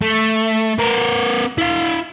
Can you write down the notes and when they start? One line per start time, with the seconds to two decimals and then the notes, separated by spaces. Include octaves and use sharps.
0.02 A3
0.79 B3 A#4
1.58 E4 F5